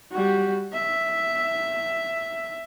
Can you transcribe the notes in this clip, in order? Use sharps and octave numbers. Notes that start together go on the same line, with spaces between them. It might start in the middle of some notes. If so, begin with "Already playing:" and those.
G3 F#4
E5